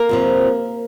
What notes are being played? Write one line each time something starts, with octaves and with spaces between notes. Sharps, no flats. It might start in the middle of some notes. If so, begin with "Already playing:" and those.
Already playing: A#3 A#4
F2 C3 F3